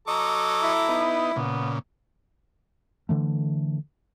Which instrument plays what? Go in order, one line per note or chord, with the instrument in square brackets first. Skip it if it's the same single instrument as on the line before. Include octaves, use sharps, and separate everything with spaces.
[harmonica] F#3 A#5 D6 [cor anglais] A4 [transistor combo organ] D#5 C#6
[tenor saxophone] E4
[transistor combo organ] B3 D#4
[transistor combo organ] A#2 C#3 [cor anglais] B3
[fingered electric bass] D3 E3 A3